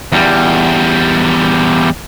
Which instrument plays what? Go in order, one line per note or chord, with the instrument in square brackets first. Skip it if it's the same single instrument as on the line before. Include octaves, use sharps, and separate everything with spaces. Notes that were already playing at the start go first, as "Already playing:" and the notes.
[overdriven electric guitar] E2 G3